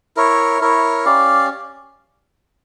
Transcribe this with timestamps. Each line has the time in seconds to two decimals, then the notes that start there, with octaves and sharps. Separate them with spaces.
0.17 E4 A#4 C#5
0.61 E4 A#4 C#5
1.05 C#4 G4 D5 F5